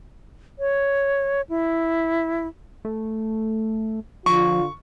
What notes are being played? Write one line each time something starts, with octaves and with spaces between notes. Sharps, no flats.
C#5
E4
A3
D3 F3 F4 C#6